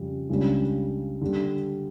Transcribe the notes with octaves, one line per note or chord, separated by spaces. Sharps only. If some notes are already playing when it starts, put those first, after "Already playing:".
Already playing: F2 C#3 G3
C#2 C#3 G3 D4
D3 G3 D4